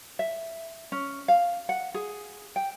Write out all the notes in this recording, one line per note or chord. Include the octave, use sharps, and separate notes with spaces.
E5
C#4
F5
F#5
G#4
G5